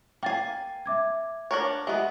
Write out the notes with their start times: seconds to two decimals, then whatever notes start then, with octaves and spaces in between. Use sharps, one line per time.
0.23 A#3 G5 G#5 A6 C7
0.86 E5 D6 G#6
1.51 D4 A#4 C#5
1.87 G#3 B3 G4 E5